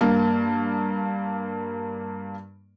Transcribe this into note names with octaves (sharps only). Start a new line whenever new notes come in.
G2 A#3